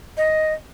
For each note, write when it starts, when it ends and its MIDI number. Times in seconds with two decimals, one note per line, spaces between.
0.17 0.52 75